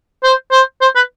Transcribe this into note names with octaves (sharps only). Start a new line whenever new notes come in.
C5
C5
C5
B4